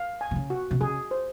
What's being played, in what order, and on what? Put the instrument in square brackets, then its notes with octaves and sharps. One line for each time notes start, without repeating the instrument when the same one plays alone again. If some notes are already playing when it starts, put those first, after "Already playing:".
Already playing: [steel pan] F5
G#5
[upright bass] C3
C#3
[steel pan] F#4
[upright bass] C3
[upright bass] C#3 [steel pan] G#4
[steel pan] C5